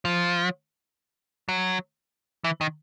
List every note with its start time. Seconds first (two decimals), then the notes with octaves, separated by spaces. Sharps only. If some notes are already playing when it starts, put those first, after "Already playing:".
0.05 F3
1.49 F#3
2.44 E3
2.61 D#3